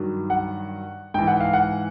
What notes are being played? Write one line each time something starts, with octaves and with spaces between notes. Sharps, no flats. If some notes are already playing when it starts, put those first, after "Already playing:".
Already playing: G2 D#3 F#3
F#5
G#2 E3 G5
F#5
F5
F#5